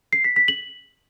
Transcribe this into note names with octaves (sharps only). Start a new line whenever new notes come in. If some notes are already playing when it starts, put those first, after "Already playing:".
C7
B6
B6
F#7